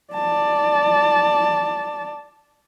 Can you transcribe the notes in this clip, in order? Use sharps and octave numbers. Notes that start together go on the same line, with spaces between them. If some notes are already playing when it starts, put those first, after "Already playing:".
D5 A5